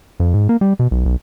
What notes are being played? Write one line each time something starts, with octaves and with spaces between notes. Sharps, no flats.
F2
G#2
A#3
G3
B2
B1
B1